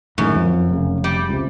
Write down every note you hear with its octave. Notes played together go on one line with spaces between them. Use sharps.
F#2 A2 D#3 G#3
F2 F3
F1 C#3
G3
C#2 C3